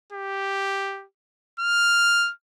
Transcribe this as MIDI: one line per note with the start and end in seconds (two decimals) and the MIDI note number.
0.12 1.05 67
1.60 2.32 89